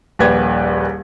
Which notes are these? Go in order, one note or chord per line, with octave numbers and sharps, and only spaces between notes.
D#1 A#1 G4 B4 G#6